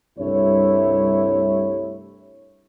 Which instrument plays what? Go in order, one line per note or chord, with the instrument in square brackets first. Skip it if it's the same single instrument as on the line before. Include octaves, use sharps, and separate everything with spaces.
[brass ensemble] C2 G2 C3 A3 E4 C#5